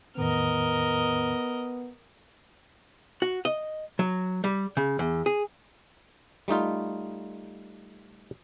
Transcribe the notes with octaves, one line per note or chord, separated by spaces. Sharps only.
E2 A2 D#3 B3 A#4 D#5
F#4
D#5
F#3
G3
C#3
E2
G#4
G3 A3 D#4 F4